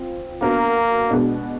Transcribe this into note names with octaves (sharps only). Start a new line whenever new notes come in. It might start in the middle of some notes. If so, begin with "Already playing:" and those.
Already playing: C4 F4
A#3 B3 D4 F#4 A#4
B2 G#3 B3 D4 F#4